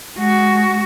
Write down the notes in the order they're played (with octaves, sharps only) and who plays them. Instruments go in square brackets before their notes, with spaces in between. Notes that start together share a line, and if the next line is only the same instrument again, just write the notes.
[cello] G#3 F#4